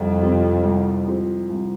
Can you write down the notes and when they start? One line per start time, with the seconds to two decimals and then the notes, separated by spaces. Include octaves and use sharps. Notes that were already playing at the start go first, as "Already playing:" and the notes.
Already playing: C2 F2
0.22 C3 F3 C4
0.64 C2
1.07 C3 F3 C4
1.49 C2